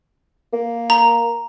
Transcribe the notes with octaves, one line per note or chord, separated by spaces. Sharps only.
A#3
A#5